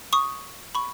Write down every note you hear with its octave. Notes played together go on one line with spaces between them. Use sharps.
C#6 D#6
B5 C#6